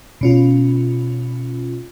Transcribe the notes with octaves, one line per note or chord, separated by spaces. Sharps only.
B2 C#4 F4